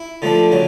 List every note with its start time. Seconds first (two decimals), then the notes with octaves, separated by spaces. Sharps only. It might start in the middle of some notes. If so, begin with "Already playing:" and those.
Already playing: E4
0.22 D3 F3 A3 D4
0.52 C#3 F#3